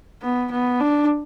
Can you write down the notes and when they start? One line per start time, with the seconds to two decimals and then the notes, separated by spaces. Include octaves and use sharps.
0.22 B3
0.51 B3
0.80 D4